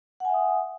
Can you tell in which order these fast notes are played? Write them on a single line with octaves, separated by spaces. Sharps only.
F#5 G#5 E5 D#6